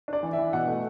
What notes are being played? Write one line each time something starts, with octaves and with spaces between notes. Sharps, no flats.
D4 D5
E3
E5
E3
B2 F#5
A3